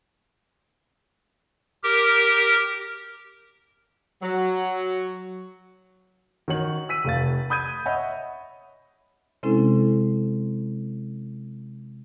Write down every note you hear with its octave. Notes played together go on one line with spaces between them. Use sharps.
G4 A#4
F#3
D#3 F#4 C#5 F#7
E6 B6 D#7
F1 A3 F5 A6
B5 D#6 G6 G#6 D#7
C#5 D#5 E5 F#5 B5
C3 G#3 C4 C#4 E4 A4